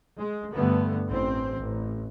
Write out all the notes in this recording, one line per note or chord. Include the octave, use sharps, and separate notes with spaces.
G#3
G2 D3 A3 B3
A1 C4
A1